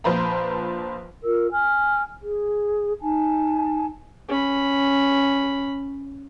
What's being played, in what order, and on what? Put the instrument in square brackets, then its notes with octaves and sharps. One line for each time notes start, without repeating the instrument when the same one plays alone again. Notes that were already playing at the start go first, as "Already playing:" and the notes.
[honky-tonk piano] A#1 F3 B4 C5 A#5 B5
[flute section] F4 A#4 E6
G#5 F6
G#4
D#4 G#5 A5
[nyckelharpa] C#4 B5